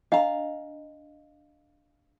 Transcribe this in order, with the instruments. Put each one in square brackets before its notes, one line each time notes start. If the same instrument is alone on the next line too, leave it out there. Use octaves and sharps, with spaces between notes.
[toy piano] D4 D#5 [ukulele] F5 A#5